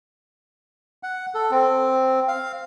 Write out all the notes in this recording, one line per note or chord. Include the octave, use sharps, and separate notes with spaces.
F#5
A4
C4
F5